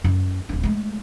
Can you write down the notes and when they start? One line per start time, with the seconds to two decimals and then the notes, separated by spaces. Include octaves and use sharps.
0.04 F#2
0.49 D1 D4
0.63 G#3 A3